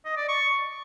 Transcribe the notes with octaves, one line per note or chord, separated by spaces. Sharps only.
D#5
D5
C#6